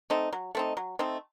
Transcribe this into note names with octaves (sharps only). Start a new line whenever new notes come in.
A3 C4 D#4
F#3
A3 C4 D#4
F#3
A3 C4 D#4